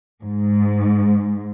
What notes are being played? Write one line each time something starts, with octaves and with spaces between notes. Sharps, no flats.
G#2